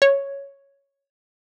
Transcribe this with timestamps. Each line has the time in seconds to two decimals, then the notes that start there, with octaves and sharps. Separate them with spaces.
0.02 C#5